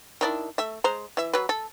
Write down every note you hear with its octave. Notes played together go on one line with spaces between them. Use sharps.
D#3 D4 E4
A3 E5
G#3 C5 A#5
E3 E5
F#3 B4
A4